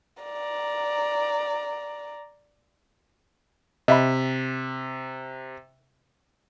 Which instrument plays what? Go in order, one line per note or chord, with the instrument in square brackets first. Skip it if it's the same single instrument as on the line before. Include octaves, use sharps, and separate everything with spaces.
[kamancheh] D5 A#5
[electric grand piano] C3 [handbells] D#5 E5 B5